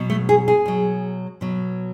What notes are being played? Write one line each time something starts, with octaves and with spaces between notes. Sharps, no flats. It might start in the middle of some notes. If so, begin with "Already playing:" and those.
Already playing: B2 F#3
A3
G#4
G#4
B2 F#3
B2 F#3